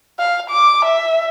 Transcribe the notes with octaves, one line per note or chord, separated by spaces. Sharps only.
F5
D6
E5